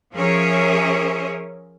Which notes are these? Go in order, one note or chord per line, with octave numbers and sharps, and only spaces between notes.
F3 C#4 G#4 A#4 C#5 E5